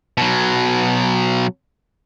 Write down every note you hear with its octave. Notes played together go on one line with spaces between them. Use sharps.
B2 F#3